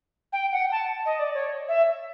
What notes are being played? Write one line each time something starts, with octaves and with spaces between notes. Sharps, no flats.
G5
F#5
A5
D#5
D5
C#5
E5